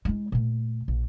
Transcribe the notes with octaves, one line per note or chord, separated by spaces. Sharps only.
G#3 E4
A#2 A3
A#1